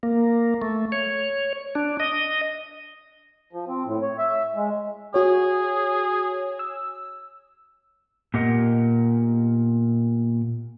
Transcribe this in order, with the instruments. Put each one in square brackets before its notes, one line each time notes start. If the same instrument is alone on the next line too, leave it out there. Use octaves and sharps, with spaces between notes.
[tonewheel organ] A#3
A3
C#5
D4
D#5
[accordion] F3
C4
A2
C#5
E5
G#3
[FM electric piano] F#4 C#5 [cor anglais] G#4
[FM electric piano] E6
[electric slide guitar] A#2 B3 G4 A#4 D#5 F#5